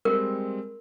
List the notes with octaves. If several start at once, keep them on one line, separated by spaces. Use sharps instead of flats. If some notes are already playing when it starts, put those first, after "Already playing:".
G3 G#3 C4 A#4